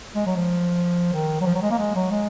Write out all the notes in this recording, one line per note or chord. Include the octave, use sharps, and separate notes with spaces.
G#3
F#3
F3
D#3
F#3
F3
F#3
G#3
A#3
G#3
F#3
G#3